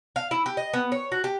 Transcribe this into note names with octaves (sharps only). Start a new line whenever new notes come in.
F5
E4
G4
D#5
B3
C#5
F#4
G4